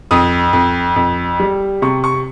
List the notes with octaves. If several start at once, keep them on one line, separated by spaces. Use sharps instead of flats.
F2 D#6
F2
F2
G3
C3 C#6
C#6